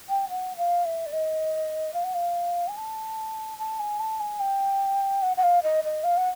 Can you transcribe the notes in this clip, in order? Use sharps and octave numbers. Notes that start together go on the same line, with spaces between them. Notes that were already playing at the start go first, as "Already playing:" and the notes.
G5
F#5
F5
E5
D5
D#5
F5
F#5
F5
G#5
A5
A5
G#5
A5
G#5
G5
F#5
F#5
F5
D#5
D#5
F5
F#5